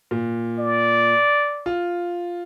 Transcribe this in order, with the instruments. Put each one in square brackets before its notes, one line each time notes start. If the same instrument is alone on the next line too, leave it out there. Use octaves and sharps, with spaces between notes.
[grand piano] A#2
[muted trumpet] D5
[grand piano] F4